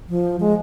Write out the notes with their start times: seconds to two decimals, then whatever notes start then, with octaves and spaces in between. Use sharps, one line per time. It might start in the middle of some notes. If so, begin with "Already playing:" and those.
0.09 F3
0.40 G#3